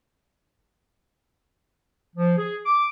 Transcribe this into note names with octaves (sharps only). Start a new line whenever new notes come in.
F3
G#4
D6